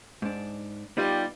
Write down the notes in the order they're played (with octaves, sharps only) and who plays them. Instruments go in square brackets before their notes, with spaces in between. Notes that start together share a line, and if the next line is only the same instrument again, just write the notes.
[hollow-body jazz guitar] G#2 D4
[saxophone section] G3 [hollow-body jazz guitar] B3 D#4 F4